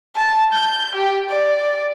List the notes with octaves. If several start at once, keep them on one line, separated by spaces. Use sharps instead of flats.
A5
G6
G4
D5